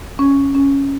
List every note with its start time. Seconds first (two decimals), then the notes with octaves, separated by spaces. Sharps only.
0.19 C#4
0.55 C#4